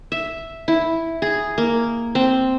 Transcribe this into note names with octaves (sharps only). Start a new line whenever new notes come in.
E5
E4
G#4
A#3
C4